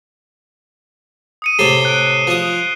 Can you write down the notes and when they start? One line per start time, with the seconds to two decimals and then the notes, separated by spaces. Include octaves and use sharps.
1.42 D#6 C#7 D#7
1.59 A2 C3 A4 C7 E7 G7
1.85 F#6 D7
2.27 F3 D#6